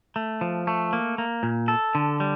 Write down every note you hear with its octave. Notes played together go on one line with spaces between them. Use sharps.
A3
F3
A3
A#3
A#3
A#2
A4
D3
G3